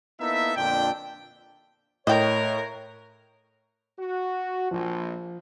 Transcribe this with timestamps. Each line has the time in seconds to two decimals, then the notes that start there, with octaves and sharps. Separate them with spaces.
0.20 A#3 B3 D#4 E4 A4 E5
0.56 F2 A#2 D3 D4 G5
2.07 A2 A#4 C#5 D#5 G5
3.98 F#4
4.71 A#1 F3